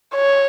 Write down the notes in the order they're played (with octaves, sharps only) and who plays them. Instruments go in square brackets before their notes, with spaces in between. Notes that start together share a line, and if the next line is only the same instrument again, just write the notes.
[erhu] C#5